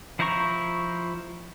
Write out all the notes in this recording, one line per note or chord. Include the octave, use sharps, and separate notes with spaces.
F3 E4 C5 A#5 C#6